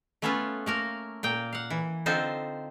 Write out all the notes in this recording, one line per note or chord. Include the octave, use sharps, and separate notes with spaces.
A3 B3 C#4 F4 A4 B4
A3 A#3 A#4
A#2 A#3 G5
F5 F#5
E3
D3 C4 D#4 F4 A4 C5